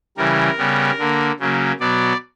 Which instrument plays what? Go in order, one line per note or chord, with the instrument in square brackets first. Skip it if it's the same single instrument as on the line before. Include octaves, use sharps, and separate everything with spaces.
[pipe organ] C#3 E3 G3 A#4
C#3 G3 B3
D3 A#3
C#3 F#3 A#3
B2 F#3 B3 D5